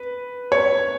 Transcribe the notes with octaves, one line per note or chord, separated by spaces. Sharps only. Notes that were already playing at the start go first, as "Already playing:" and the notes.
Already playing: B4
C#5